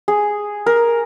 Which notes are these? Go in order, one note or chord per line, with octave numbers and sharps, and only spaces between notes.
G#4
A#4